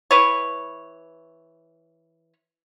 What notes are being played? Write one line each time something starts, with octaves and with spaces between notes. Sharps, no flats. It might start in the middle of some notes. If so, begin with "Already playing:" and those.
E3 B4 C#5